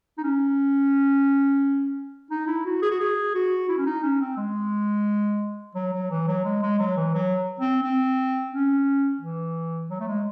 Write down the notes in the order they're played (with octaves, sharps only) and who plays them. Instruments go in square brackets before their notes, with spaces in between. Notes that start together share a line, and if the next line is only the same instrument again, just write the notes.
[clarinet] D#4
C#4
D#4
E4
F#4
G#4
F#4
G#4
F#4
E4
C#4
D#4
C#4
C4
G#3
F#3
F#3
E3
F#3
G#3
G#3
F#3
E3
F#3
C4
C4
C#4
E3
F#3
A3
G#3